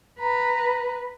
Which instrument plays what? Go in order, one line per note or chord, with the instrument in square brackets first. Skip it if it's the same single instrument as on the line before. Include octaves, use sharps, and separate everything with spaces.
[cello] B4 [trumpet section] A#5